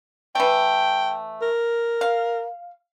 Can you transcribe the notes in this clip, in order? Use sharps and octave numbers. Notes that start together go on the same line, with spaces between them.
E3 A3 G5
A#4
F5